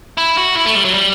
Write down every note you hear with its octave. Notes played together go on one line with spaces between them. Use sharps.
E4
F#4
E4
A3
G3
F#3
G3